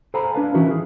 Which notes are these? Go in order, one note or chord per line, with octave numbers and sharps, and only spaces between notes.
A4 C5 F5 G#5 A#5 B5
D4 B4 F5 A5
E3 C#4 D#4 E4 F#4 A#4
G#4